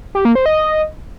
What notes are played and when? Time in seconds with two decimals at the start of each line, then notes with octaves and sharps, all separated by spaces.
0.15 G4
0.25 A#3
0.35 C5
0.46 D#5